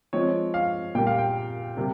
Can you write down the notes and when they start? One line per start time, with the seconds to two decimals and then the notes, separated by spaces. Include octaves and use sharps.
0.13 F3 G#3 C4 C#5
0.54 F5
0.95 A#2 G3 A#3 G5
1.07 F5
1.18 G5
1.77 C3 G3 A#3